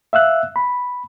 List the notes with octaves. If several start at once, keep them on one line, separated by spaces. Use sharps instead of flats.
E5 F5 E6 F#6
B5